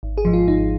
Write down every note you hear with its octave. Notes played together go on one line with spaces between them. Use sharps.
G#1
G#4
G#2 F3
F4
G#1 D#4